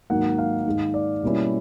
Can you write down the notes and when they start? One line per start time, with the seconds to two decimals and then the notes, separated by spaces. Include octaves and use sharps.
0.10 G#2 D#3 F#3 A#3 D#4 F#5
0.38 F5
0.66 G#2 D#3 G#3
0.94 D5
1.23 B2 G3 A#3 C#4 E4